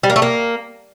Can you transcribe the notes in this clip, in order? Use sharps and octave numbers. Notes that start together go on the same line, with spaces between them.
G3
A#3
A3
A#3